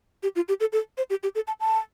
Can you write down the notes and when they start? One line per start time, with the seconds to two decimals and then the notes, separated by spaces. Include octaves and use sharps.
0.23 G4
0.36 F4
0.48 G4
0.60 A4
0.72 A4
0.98 C5
1.10 G4
1.23 G4
1.35 A4
1.47 A5
1.60 A5